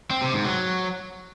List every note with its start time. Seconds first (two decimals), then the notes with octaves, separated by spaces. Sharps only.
0.11 C4
0.22 C3
0.34 G#2
0.45 F#3